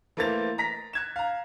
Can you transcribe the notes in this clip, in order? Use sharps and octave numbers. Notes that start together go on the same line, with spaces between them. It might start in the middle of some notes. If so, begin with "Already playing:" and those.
E3 A3 A#3 C5 A6 F7
A#5 A#6 B6
F#6 G#6 E7
F5 A#5